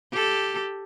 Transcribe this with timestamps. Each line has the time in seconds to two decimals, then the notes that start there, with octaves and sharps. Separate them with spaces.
0.12 G4 A4